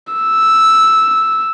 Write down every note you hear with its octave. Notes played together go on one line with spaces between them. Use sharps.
E6